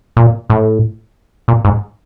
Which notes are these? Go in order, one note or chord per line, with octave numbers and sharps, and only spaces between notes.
A#2
A2
A#2
G#2